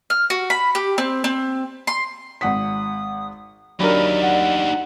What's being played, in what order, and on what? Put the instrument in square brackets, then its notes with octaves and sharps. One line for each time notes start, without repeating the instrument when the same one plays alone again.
[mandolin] F6
F#4
B5
G4
C4
C4
C6
[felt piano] G#1 F#5 B6 [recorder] D#6
[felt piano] F#3 D4 A#4 [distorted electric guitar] D#4 G4 [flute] D5 [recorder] B5
[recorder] F#5